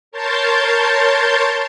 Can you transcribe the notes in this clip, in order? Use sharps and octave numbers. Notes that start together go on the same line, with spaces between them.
A#4 C#5 A5 C6 G6 A6